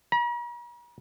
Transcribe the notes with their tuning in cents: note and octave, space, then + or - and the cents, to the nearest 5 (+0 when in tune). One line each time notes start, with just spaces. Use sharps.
A#5 +45